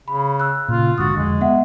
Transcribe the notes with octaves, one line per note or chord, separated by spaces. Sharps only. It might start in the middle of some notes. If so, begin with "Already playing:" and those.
C#3 B5
E6 F#6
A#2 C#3 F4
A#1 G#2 D3 F#4 D#6 A6
F2 D3 G#3
B3 E5 F#5